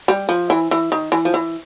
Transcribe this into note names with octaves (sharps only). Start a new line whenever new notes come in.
G3
F3
E3
E3
D#3
E3
F3
E3